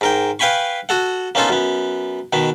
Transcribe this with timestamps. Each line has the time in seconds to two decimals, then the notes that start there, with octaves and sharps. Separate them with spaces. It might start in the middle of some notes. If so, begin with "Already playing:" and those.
0.01 G#2 A#4 G5
0.39 B4 F5 G5 G#5 B5 C#6
0.89 F#4 A4 F#5
1.35 A#3 B3 C#4 D#4 F4 A4
1.49 F#2 B3
2.33 B2 D#3 B3